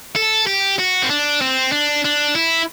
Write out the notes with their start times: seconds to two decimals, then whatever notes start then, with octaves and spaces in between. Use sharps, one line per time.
0.16 A4
0.47 G4
0.79 F#4
1.03 C4
1.10 D4
1.41 C4
1.72 D4
2.04 D4
2.35 E4